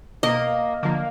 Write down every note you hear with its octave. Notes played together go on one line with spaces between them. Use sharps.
B2 A#3 D#5
D3 F3 A#3